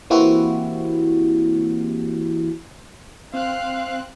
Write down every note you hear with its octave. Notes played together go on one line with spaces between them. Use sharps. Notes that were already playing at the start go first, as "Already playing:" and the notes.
E3 A#3 C4 E4 F#4 G4
C4 F5 F#6